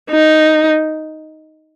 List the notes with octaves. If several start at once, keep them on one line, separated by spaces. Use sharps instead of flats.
D#4